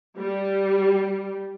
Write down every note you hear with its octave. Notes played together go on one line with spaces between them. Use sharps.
G3